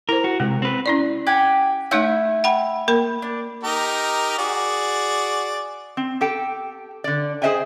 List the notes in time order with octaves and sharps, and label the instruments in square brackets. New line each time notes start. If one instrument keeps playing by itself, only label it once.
[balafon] E4 C5 [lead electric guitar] A#4
[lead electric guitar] F#4
[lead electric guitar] C3 [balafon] G#3
[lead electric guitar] C4 B4
[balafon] C#4 E4 D5
[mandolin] G4 F#5 G#5
[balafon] A3 D#4 C#5 [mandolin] E4 E5 G6
[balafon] F#5 G5 B5
A#3 A#4 B5
[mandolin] D4
[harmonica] D#4 G4 A#4
F#4 G#4 D5
[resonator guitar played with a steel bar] C4
G4 A4 G5
D3 D5
G#4 C5 D#5 E5 G5 G#5